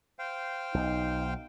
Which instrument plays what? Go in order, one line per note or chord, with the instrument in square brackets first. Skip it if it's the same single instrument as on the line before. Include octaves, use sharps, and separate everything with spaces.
[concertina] C5 F5 G5
[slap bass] B1 [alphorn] D#4